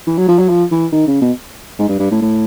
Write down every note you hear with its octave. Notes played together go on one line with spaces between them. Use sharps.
E3
F#3
F3
F#3
F3
E3
D#3
C#3
B2
G#2
G2
G2
A2
A2